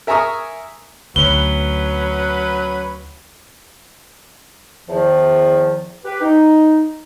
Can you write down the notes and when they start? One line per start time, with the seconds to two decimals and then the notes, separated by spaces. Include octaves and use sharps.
0.07 A#4 E5 G#5 A#5 C#6 D#6
1.16 D2 F#3 C#4 B4 G7
4.89 E2 D#3 F3
6.03 G4 B4
6.21 D#4